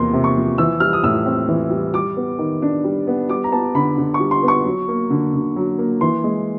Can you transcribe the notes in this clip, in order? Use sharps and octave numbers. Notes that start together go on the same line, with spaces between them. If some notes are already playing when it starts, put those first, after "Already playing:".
Already playing: E2 C3 F3 A#3 C6
C3
C#6
F3
E3 E6
G3 F6
D#6
A2 E6
C4
E3
G3
G3 D6
B3
D#3
D4
G3
B3
G3 D6
A#5
B3 A5
D3 B5
D3
C#6
G3
C6
B3
C#6
F#3
A#3
D3
D3
F#3
A#3
E3 C6
G#3